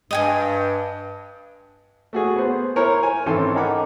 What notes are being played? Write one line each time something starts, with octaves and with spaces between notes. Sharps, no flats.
G2 D#5 G5 G#5
A3 F#4 G#4
B3 C5
E4 A#4 C5 C#5
G#5
G#1 E3 C4 C#4 A4 C6
D#4 A#4 F#5 B5 D6